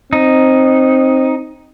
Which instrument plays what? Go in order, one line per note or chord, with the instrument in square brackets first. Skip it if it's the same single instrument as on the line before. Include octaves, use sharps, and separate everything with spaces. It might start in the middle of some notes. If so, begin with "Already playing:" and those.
[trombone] C4 [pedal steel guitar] D#4